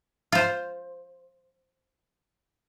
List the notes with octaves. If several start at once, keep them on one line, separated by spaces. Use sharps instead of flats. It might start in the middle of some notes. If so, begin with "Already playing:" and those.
F4 C5